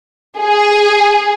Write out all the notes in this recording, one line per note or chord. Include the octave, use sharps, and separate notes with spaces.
G#4